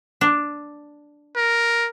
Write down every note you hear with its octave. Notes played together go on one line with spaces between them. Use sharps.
D4
A#4